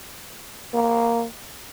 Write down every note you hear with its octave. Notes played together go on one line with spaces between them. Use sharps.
A#3